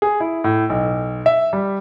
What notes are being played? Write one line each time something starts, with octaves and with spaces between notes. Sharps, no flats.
G#4
E4
A2
B1
E5
G3